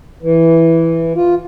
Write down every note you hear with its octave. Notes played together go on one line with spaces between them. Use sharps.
E3
F4